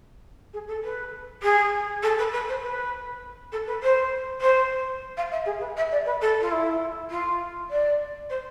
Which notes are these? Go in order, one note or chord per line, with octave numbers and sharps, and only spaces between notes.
G#4
A4
B4
G#4
A4
B4
B4
C5
B4
A4
B4
C5
C5
F5
E5
G#4
B4
E5
D5
B4
A4
F4
E4
F4
D5
C5